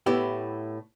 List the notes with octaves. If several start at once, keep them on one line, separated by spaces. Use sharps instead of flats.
A2 B3 E4 G4